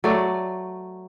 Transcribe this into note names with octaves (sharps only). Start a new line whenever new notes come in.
F#3 A3 D5